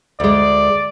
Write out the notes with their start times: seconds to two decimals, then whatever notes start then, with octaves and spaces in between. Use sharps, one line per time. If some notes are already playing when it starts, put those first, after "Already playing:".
0.20 D2 G#3 D5